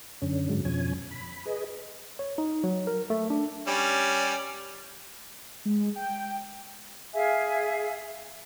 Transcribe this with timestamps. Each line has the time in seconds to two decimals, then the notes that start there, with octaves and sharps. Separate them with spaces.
0.22 F#2 D3 C#4
0.49 G#2 D3 F#3 G#3
0.65 F2 B2 F3 C#4 G#5
1.11 B5
1.46 G#4 B4 D#5
2.19 C#5
2.38 D#4
2.64 F#3
2.87 A#4
3.10 A3
3.30 D4
3.67 G3 C#4 D5
5.65 G#3
5.96 G5
7.14 G#4 E5 F5 G#5